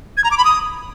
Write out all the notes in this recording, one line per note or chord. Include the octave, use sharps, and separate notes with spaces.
G#6
A#5
D6
B5
D#6